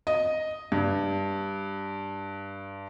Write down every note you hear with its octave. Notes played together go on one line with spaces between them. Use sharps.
D#5
G2